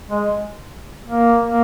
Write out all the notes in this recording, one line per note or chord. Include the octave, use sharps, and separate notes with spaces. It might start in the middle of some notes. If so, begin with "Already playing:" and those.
G#3
A#3
A#3